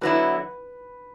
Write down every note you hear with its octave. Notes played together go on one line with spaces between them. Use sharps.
D3 F#3 B3 E4 B4